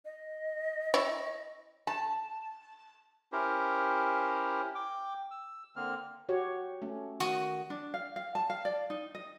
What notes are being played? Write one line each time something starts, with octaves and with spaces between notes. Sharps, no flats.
D#5
E4 C#5
A5
C#4 E4 G4 A#4 C5
G5 D6
E6
D3 A#3 C4 F6
F#4 G4 C#5
A3 C#4
D#3 F#4 C#6 D#6
D4
F5
F5
A5
F5
D5
D#4
D#5